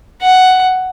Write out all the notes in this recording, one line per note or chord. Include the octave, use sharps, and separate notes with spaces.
F#5